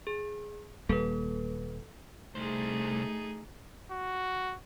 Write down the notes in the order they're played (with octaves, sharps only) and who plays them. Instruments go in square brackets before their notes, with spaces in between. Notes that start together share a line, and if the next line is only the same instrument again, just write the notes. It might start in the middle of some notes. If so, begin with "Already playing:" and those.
[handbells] G#4
[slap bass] D#1 G3 A#3 [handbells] A4 B4
[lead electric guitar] C2 C5 [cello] A3 [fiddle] D#4 G#4
[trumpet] F#4